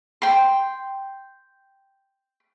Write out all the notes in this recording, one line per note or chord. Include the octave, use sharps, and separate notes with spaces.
G5 C6